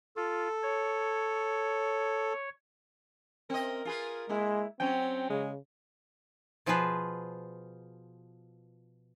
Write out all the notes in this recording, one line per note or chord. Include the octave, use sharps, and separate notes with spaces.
F4 A4
C#5
C4 A#4 D#5
F4 G#4 B4
G#3 A#3 E4
F#3 C4 C#4 G5
C#3 G#3
B2 F3 F4 G#4 B4 C5